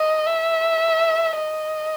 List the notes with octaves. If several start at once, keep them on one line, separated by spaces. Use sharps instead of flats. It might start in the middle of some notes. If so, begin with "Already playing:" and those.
Already playing: D#5
E5
D#5